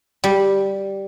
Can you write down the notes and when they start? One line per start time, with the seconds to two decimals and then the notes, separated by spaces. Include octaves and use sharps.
0.24 G3